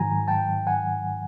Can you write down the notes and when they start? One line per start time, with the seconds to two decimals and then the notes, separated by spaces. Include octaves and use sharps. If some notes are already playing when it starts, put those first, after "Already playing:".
Already playing: G#2 D#3 F#3 G#5 A#5
0.28 G5 A5
0.67 F#5 G#5